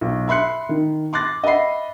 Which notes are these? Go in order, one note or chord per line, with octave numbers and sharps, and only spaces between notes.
B1
E5 B5 C6 F#6 C#7
D#3
C6 D6 F#6 A6 A#6
D#5 E5 F#5 B5 C7